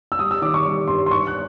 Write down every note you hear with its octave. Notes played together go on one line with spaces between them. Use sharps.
E6
G3 D#6
E6
D#3 D6
C#6
G3
G2 C6
C6
G2 C#6
F#6